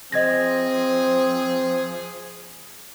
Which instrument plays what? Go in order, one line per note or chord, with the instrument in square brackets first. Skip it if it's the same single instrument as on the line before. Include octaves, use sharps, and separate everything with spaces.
[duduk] F3 [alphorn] C4 [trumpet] G#4 [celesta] D#5 G#6 A#6